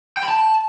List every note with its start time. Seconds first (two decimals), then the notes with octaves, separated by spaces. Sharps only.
0.17 G5
0.23 B5
0.28 A5